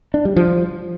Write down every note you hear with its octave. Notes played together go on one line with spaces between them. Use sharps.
D4
G3
F3